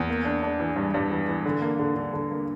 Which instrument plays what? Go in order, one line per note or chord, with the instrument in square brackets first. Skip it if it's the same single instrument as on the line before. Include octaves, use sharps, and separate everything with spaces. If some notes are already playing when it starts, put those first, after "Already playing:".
Already playing: [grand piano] E2
A#3
D4
D4
E3
G2
G2
E3
E3
D3
A#3
D3
D3
D3
A#3